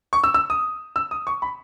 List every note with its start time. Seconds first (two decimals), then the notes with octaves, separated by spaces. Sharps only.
0.13 C#6
0.24 E6
0.34 E6
0.50 D#6
0.96 E6
1.11 D#6
1.27 C#6
1.42 B5